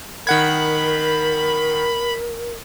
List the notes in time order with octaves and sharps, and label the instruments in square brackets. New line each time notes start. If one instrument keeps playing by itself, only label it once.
[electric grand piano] D#3 F#5 G#6 [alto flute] A#4 [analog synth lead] B5